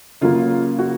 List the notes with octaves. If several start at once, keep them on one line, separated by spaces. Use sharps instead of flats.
C#3 F#3 A#3 F4
F#4